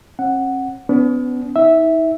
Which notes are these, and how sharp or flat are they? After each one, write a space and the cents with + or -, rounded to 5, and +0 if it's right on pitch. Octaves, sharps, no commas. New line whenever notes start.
C#4 -45 F#5 +0
B3 +25 D4 -45
D#4 +45 E5 -10